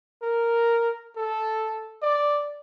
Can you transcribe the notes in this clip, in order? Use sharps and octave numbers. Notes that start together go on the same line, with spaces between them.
A#4
A4
D5